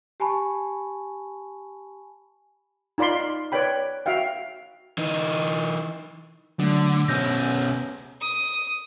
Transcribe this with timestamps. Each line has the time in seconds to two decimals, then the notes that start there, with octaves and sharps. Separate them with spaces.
0.20 G4 G#5 A5 B5 C#6
2.98 D#4 F4 D5 B5 C6
3.52 B4 C#5 D5 G5 B5
4.06 F#4 E5 F5 G5
4.98 E3 D#4
6.59 D3 F#3 A3
7.08 B2 C#4 E6 G6 A#6
8.21 D#6